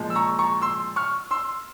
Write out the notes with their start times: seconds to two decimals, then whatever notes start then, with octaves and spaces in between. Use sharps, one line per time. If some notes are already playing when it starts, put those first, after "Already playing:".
Already playing: A#2 F3 G#3
0.10 E6
0.15 A#5 C#6
0.39 A#5 C#6
0.62 C6 E6
0.96 C#6 F6
1.31 C6 E6